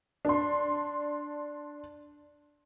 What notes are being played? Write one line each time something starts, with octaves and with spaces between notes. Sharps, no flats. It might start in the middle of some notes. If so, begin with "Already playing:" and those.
D4 C6